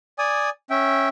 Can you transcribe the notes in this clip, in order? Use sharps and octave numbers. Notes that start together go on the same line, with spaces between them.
D5 G#5 D#6
C#4 E5 G5